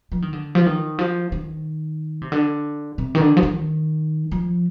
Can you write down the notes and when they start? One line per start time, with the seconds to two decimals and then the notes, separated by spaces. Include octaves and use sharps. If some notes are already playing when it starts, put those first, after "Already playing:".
0.12 F3
0.22 D#3
0.33 D3
0.55 F3
0.66 D#3
0.99 F3
1.32 D#3
2.22 C3
2.32 D3
2.98 C3
3.15 D#3
3.21 D3
3.37 F3
3.43 D#3
4.31 F3